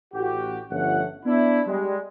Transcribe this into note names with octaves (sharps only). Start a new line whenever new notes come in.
A1 F#4 G4
G1 F3 A3 C#4 F#5
B3 D4 E4
G3 G#3